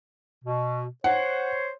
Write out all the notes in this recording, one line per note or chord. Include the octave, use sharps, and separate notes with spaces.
B2
C5 C#5 F#5